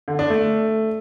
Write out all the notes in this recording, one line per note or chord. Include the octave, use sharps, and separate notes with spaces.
D3
D4
A3